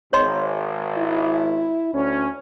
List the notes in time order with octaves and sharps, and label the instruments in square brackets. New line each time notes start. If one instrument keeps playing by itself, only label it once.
[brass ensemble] G#1 [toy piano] C#5 D#5 C6
[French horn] E4
[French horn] D2 [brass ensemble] C#4